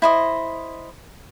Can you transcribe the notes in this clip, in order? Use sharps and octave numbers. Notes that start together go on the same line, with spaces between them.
E4 C5 D#5